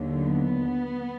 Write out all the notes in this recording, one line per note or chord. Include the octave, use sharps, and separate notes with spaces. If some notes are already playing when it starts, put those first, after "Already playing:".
Already playing: D#2 D3 F#3
B3